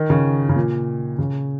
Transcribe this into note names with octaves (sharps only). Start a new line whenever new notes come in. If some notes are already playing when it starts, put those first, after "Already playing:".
Already playing: D#3
C#3
C#3
A#2
C#3